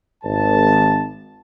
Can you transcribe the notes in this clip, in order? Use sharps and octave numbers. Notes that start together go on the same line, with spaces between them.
G#1 A5